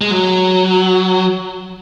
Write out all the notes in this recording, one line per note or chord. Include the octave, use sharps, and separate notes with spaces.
G#3
F#3